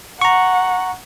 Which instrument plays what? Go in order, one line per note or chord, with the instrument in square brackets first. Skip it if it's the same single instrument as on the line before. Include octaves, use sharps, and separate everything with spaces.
[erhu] F#5 [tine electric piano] A#5 C#6